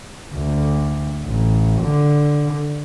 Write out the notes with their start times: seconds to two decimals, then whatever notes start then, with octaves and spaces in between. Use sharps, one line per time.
0.33 D2
1.26 A1
1.82 D3